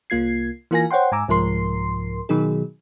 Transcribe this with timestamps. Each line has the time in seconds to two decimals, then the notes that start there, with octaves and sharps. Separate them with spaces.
0.10 C2 A#3 F4 G#6 C7
0.71 E3 A#3 F4 A#4 G#5 A#6
0.91 C5 C#5 F#5 G5 C6
1.12 G#2 G#5 A#5 D6 E6
1.28 C2 G#2 F3 A#4 C6 C7
2.29 B2 D#3 F#3 D#4 G#4